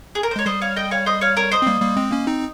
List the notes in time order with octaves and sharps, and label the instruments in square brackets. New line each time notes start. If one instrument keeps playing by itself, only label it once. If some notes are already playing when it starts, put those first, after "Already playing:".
[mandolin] G#4
A#4
C5
[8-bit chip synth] G#3 [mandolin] C#5
[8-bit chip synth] G3 [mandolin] C5 D#5
[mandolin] C#5 F5
D#5 G5
C#5 F5
C5 D#5
C#5 F5
A#4 C#5
C5 D#5
[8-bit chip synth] C4
G3 A#3
G3 A#3
G#3 C4
A#3 C#4
C4 D#4